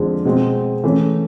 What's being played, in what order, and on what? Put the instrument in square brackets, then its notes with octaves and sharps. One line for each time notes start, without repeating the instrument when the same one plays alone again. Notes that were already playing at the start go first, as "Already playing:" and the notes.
Already playing: [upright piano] F2 D3 F3 G#3
B2 G#3 C4
E3 A3 C#4